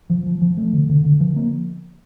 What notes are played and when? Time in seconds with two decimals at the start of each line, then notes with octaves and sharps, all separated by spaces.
0.10 F3
0.26 F3
0.42 F3
0.57 A3
0.73 D3
0.89 D3
1.05 D3
1.20 F3
1.36 A#3